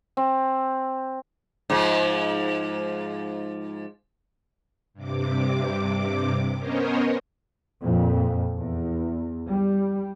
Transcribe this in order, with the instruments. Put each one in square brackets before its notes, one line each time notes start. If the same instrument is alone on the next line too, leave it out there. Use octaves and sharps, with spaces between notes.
[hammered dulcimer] C4
[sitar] G#2 F3
[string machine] G2 C3 D6
B3 C#4 A#4 C5 C#5 D#5
[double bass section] F2 A#2
E2
G3